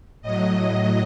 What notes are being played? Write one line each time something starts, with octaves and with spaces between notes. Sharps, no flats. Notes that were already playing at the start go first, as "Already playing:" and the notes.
A2 F#3 D#5